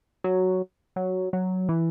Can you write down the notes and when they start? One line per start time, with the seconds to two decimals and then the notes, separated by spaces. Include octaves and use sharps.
0.24 F#3
0.96 F#3
1.33 F#3
1.69 E3